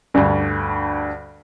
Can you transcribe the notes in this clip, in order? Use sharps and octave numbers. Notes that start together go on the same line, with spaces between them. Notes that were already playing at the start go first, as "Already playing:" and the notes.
D2 G2